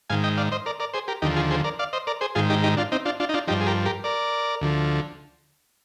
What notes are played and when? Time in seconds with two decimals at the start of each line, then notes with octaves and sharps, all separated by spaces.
0.10 G#2 D#3 F5 G#5
0.24 D#5 G5
0.37 D5 F5
0.52 C5 D#5
0.66 A#4 D5
0.80 A#4 D5
0.94 G#4 C5
1.08 G4 A#4
1.22 D#2 D3 F3 D#4 G4
1.36 F4 G#4
1.51 G#4 C5
1.64 A#4 D5
1.79 D5 F5
1.93 C5 D#5
2.07 A#4 D5
2.21 G#4 C5
2.35 G#2 D#3 F4 G#4
2.50 D#4 G4
2.63 D#4 G4
2.77 D4 F4
2.92 C4 D#4
3.05 D4 F4
3.20 D4 F4
3.29 D#4
3.34 D4 F4
3.48 G2 F3 D#4 G4
3.61 G#4
3.67 G4 A#4
3.86 G4 A#4
4.04 A#4 D5
4.61 D2 D3 F3